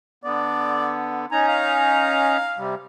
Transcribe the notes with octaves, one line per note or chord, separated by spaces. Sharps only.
D3 B3 D5
C#4 D#4 G#5 A#5
F5
C3 G3